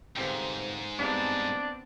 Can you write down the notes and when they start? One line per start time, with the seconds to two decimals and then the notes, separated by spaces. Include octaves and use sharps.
0.17 G1 G#2 C3 G5
0.99 G2 G#3 B3 C4 D4